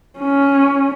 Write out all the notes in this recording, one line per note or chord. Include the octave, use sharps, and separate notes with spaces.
C#4